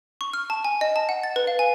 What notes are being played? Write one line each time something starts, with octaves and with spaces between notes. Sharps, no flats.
C#6
F6
A5
G#5
D#5
A5
F#5
A6
B4
F5
G#5